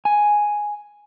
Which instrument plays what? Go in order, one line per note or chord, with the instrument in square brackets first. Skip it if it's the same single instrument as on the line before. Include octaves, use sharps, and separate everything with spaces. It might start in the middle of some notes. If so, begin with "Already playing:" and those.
[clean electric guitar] G#5